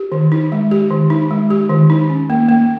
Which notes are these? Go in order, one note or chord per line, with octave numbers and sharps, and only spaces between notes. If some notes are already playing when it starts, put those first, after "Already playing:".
Already playing: G4
D#3
D#4
G#3
G4
D#3
D#4
G#3
G4
D#3
D#4
C#4
A#3
A#3